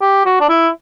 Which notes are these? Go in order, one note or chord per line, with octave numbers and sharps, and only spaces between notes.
G4
F#4
D4
E4